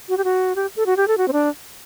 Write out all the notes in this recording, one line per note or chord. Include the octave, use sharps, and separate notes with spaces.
F#4
G4
F#4
G4
A4
F#4
G4
A4
F#4
C4
D4